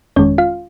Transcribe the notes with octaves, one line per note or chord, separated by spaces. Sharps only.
G1 F2 D#3 G#3 C#4 C#5
F4 F5